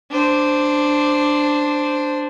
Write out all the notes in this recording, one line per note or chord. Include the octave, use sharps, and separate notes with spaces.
D4 C5